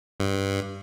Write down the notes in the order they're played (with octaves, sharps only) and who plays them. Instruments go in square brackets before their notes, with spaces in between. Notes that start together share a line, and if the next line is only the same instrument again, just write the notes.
[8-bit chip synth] G2